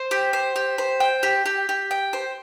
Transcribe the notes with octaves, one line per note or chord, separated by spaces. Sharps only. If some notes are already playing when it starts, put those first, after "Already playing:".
Already playing: C5
G4
C5
G4
C5
G5
G4
G4
G4
G5
C5